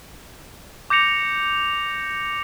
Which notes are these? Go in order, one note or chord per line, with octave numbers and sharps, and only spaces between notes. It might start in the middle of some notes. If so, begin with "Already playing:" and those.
D6 G6 A#6 C#7 F7